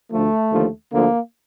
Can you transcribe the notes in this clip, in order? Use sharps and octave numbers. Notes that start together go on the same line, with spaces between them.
D2 D3 F3 A3
D#2 D3 F3
D2 D3 F3 A#3